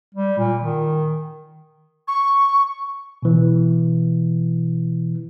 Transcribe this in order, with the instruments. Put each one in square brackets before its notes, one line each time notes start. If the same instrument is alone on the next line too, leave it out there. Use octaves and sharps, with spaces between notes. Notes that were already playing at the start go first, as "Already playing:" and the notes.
[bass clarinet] G3
A#2
D#3
[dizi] C#6
[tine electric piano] B2 E3